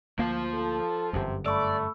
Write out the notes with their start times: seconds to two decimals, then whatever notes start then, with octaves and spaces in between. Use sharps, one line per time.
0.19 D2 F3 A#3 F5
0.54 A4
1.13 G1 F#2 C3
1.46 A3 D5 B5 C#6 E6